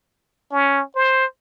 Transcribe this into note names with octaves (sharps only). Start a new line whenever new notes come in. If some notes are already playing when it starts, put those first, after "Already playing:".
C#4
C5